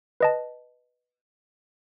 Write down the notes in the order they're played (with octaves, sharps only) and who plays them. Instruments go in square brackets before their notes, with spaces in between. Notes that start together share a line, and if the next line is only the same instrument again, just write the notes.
[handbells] B4 D#5 A5